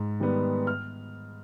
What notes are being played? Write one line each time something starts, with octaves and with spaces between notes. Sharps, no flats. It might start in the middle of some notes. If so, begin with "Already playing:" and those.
Already playing: G#2
D#3 G3 B3
F6